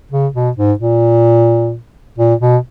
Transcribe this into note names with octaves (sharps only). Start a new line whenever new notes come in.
C#3
B2
G#2
A#2
A#2
B2